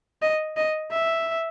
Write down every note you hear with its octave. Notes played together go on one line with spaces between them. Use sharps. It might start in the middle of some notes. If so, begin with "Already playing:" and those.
D#5
D#5
E5